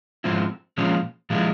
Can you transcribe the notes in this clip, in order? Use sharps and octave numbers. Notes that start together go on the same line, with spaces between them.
G#2 F3 C4 E4
A#2 F3 G#3 C#4
A#2 F3 G#3 E4